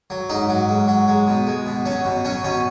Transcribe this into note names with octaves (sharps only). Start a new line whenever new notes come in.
F#3
G#2 D#4
F#3
G#2
F#3
G#3
B2
G#3
B2
F#3 C#4
B2
F#3 C#4
B2 C#4